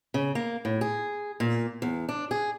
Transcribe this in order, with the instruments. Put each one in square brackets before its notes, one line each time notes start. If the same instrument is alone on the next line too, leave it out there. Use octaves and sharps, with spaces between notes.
[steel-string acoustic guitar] C#3
A#3
A2
G#4
A#2
E2
D4
G#4